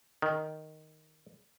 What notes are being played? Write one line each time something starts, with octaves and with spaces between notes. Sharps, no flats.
D#3